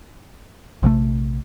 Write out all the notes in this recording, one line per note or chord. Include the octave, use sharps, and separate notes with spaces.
A#1 C3 E3 A3